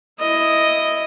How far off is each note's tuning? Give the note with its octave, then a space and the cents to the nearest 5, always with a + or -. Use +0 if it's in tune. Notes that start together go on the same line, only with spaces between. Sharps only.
E4 +0 D#5 +0